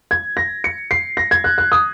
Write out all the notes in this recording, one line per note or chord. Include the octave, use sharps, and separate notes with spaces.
G#6
A#6
C#7
C7
A#6
G#6
F#6
F#6
D#6